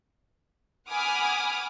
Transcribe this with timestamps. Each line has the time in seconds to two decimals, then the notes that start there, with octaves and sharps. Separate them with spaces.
0.88 F#5 G#5 B5 D6 D#6 F6